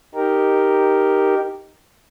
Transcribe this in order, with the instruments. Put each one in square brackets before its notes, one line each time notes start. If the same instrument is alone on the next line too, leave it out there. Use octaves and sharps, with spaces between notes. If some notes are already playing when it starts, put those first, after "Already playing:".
[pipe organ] D#4 G4 A#4